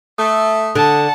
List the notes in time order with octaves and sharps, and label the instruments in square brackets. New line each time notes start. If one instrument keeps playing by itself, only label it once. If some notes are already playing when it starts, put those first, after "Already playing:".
[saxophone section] A3 [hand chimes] D#6
[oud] D3 [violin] F#5 A5